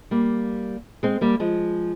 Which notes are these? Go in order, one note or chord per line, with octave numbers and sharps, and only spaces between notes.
G3 A#3
G#3 C4
G3 A#3
F3 G#3